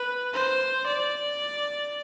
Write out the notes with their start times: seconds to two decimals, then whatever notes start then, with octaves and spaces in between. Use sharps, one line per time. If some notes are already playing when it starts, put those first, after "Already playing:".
Already playing: B4
0.33 C5
0.87 D5